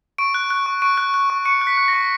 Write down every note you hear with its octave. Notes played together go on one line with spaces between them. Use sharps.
C#6 D7
F#6
F#6
C#6
C#6 D7
F#6
F#6
C#6
C#6 C#7
F#6
B6
F#6
A#6
C#6